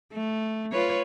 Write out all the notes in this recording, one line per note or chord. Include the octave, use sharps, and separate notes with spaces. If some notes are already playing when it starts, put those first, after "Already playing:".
A3
F4 B4 C#5